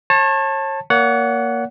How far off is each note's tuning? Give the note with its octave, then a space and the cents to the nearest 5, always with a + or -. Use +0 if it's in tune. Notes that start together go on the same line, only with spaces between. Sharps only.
C#5 -35 A5 +10 C#6 -35
A#3 +0 C#5 +45 F#5 +0